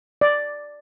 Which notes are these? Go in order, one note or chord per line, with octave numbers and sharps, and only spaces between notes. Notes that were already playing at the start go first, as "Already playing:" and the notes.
D5